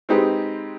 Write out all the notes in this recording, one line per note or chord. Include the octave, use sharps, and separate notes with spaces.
G#3 C4 D#4 G4 B4